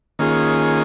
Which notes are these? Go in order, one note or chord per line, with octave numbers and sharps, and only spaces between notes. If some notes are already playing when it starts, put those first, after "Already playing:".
D#3 A#3 C#4 F4 G#4